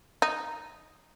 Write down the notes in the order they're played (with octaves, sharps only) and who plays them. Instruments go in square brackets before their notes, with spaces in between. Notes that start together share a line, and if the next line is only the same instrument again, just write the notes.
[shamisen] D#4